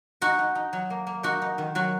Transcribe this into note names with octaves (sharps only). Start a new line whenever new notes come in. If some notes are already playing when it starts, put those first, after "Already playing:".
D#4 F#4
D#4
D#4
F#3
A#3
A#3
D#4 F#4
D#4
D#3
F#3 F#4